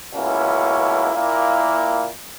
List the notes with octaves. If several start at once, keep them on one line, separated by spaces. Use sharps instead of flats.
C#2 B2 A#3 C#4 E4
A#2 A#3 E4